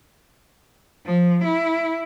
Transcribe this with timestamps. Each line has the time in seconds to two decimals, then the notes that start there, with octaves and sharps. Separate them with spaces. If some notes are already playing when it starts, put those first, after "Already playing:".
1.05 F3
1.44 E4